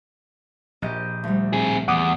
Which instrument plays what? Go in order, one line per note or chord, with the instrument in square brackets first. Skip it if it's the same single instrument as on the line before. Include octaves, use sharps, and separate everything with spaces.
[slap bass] A#1 [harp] G4 D#5
[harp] D2 G3
[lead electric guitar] C4 G#4
[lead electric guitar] E2 [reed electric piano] F#5 D6 D#6